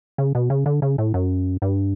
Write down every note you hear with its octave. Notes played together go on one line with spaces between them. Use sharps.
C#3
B2
C#3
D3
C#3
A2
F#2
G2